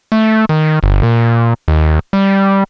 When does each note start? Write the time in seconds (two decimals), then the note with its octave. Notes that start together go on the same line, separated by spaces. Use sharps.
0.12 A3
0.49 D#3
0.83 G1
1.03 A#2
1.68 D#2
2.13 G3